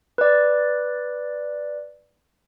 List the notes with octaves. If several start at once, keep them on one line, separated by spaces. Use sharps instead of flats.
B4 D5